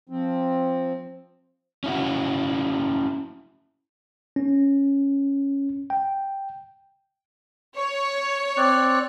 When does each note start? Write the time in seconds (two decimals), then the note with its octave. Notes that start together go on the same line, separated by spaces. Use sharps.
0.09 F3 C4
1.84 C#4 E4 F#4
4.36 C#4
5.90 G5
7.77 C#5
8.57 C4 D5 F#6